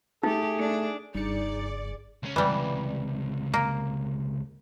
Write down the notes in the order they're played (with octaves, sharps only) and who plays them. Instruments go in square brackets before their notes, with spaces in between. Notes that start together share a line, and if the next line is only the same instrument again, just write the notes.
[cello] A3 G4 [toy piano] D#4 [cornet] G#4
[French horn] A3 [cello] D4
[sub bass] F#1 [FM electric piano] G2 C#7 [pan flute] D#4 [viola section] G#4 D5
[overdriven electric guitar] C#2 C#4
[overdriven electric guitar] C#2 C3 [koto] E3 G3
[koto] A#3